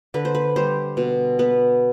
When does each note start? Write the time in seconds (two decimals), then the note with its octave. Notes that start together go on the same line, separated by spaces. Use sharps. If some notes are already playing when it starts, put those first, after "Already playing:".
0.14 D3 B4
0.25 C5
0.35 B4
0.56 G3 C5
0.97 B2
1.39 B3 B4